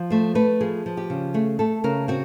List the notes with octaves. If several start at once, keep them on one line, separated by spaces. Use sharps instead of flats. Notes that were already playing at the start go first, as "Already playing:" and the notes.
Already playing: F3
A3 C5
A3 B4
F3 G#4
F3
G4
C#3
A3 G#4
A3 A4
C#3 A#4
C4 F#4